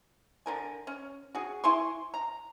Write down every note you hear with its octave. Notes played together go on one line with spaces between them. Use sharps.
D3 A#4 G#5
C#4
F#4 G#4
E4 G#5 C6 C#6
A#5